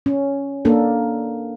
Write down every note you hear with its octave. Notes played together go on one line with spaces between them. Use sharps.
C#4
A#3 D4 A4